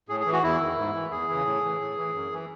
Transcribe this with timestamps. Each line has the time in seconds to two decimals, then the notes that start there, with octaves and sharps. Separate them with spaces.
0.09 A2 G#4
0.20 G#4
0.26 E3
0.32 F#4
0.43 E2 E4
0.60 D#3
0.78 G#2
0.94 E3
1.11 E2 G#4
1.28 C#3 E3
1.45 A2
1.64 E3
1.81 A2
1.97 E3
2.14 F#2
2.32 E3